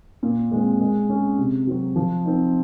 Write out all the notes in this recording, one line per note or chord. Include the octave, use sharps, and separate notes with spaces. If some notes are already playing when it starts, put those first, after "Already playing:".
A#2
G#3 C4
G#3
C#4 G#4
C3
F#3 C4 F#4
F3
C4 D#4